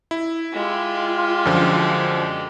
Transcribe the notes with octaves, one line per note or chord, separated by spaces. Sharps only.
E4
G#3 F4 G4
F#2 D3 F3